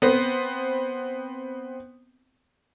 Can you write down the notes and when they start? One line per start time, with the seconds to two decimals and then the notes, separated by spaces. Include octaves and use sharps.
0.02 B3 C4